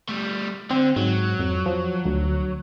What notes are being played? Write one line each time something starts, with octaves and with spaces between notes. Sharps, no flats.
G3 A3
D3 C4
G#2 F#3
F2
F3
D2